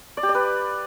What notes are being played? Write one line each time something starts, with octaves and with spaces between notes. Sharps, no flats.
D5
G4
D5
B4